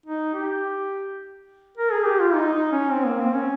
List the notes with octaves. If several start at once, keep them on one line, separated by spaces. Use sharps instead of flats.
D#4
G4
A#4
G#4
G4
F4
D#4
D#4
C#4
C4
A#3
C4
C#4